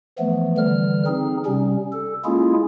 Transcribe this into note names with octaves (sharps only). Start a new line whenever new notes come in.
E3 F3 A3 B3
D3 E3 G3 F6
C4 D#4 G#4
C3 G3 C#4
A4
G#3 A#3 C#4 E4 F4 G#4